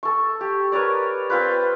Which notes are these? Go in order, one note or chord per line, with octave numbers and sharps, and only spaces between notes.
A4 C#6
G4
A#4 B4 C#5 D5
C4 F4 B4